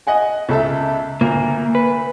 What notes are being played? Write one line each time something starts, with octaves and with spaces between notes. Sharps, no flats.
D#5 F#5 G#5
C#2 A4 E5
D2 A#3
B4